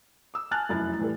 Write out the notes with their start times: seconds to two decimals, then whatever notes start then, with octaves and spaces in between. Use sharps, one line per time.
0.34 D6 E6
0.51 G#5 A5 F6 F#6 A6
0.69 F1 F#2 E4 A6
0.99 A2 E3 G3 A4